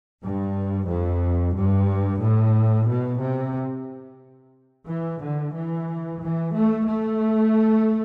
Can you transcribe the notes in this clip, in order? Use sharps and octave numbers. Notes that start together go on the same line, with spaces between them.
G2
F2
G2
A2
B2
C3
E3
D3
E3
E3
A3
A3